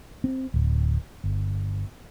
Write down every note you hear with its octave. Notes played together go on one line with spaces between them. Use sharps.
C4
D1
G1